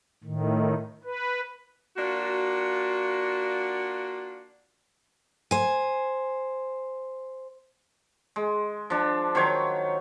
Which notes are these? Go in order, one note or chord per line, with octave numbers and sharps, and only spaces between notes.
A2 D#3
B4
A#3 D4 F4 F#4
C5 G#5
G#3
F3 D4
D#3 F#3 C5 C#5